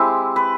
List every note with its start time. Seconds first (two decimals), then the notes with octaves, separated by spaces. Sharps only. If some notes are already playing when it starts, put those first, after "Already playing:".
Already playing: G#3 C4 E4 G4
0.36 B4